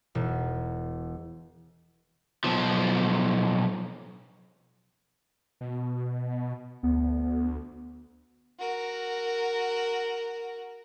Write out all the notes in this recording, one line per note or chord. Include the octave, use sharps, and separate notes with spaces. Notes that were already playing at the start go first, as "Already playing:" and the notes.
E1
B1 F3
B2
D2 B3
F#4 A#4